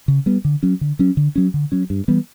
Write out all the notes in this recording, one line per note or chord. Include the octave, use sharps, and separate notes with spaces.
C#3
G3 B3
D3
F#3 C#4
D3
F#3 C#4
D3
F#3 C#4
D3
F#3 C#4
G2
E3 G3 B3